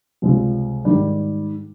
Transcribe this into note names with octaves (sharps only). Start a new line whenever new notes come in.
C#2 C3 G3 C4 F4
G#2 D#3 G3